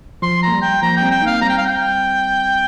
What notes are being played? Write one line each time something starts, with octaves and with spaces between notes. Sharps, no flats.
F3 C6
A#3 A#5
G3
G5
F3 A#3 A#5
G5
G3 C4
G5
A#3 D#4 F5
G3 C4 A#5
G5
F5
G5